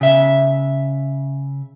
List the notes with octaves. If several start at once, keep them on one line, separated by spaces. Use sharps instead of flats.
C#3 E5